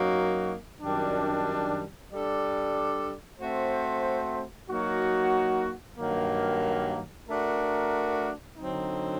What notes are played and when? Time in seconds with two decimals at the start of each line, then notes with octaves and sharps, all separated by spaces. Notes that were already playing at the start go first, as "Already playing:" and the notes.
Already playing: F#2 F#3 A#3 D#4 F#4
0.80 F#2 D#3 G3 D4
2.10 G3 D4 A4 D5
3.39 A3 C4 F#4 C5
4.68 F#3 A#3 D#4 F#4
5.98 G2 D#3 F#3 A#3
7.28 A3 D4 F#4 A#4
8.57 D3 F#3 C4 D#4